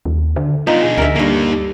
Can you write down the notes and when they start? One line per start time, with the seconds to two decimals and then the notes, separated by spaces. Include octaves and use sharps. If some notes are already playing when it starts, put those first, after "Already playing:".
0.05 D#2
0.36 D3
0.67 B3 D4 D#4 F4
0.82 D4 G#4
0.98 D2 A#4 E5
1.16 G2 A#3 D#4 A4